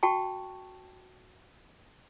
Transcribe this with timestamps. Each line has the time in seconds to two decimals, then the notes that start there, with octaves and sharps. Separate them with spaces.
0.03 F#4 G5 A5 C#6